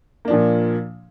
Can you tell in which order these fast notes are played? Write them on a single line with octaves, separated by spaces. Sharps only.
A#3 D4 F3 A#2